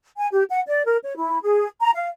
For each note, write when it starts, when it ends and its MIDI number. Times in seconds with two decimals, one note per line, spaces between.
0.17 0.27 80
0.32 0.43 67
0.49 0.61 78
0.66 0.83 74
0.86 0.97 70
1.04 1.15 73
1.17 1.40 64
1.42 1.66 68
1.81 1.91 82
1.94 2.08 77